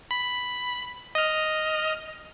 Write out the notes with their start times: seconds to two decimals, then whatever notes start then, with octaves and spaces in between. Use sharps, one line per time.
0.11 B5
1.15 D#5 F6